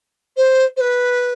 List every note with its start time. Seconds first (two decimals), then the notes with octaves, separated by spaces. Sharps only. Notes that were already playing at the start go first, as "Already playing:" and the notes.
0.37 C5
0.77 C5
0.81 B4